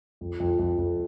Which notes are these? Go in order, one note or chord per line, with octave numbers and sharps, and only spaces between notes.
F2
F2
F2
F2